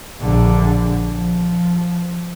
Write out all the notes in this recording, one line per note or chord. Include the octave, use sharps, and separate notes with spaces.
A#1 D3
F3